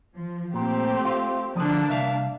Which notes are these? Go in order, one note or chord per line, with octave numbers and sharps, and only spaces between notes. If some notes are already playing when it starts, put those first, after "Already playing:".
F3
A#2 A3 C4 G4
F4
D3 F3 A#3 D4
C2 E5 F5